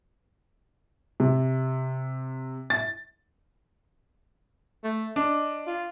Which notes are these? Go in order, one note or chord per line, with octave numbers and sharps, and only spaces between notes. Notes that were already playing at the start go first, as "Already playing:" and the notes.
C3
A6
A3
D4 D#5
F4